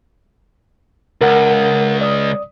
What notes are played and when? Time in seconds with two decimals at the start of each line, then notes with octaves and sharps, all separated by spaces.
1.21 C#2 A#4 F#5
2.01 D5 D#6